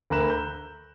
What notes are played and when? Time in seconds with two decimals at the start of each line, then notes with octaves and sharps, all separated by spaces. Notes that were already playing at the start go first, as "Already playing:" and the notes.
0.10 D2 A#4 A#5 B5 F#6 E7
0.30 G6